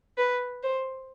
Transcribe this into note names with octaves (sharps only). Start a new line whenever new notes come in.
B4
C5